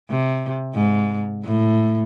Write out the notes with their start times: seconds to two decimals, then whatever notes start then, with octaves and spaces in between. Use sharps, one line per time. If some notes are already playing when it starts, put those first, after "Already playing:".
0.10 C3
0.75 G#2
1.45 A2